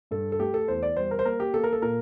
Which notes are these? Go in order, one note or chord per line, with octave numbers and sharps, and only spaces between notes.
G2 A4
A4
A3 G4
A4
E2 C5
D5
G3 C5
A#4
C5
A#3 A#4
G4
A#3 A4
A#4
A4
A#2 A#4